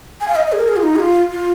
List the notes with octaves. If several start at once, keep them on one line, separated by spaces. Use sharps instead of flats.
G#5
F5
D#5
D#5
G#4
A#4
G#4
F4
D#4
G#4
F4
F4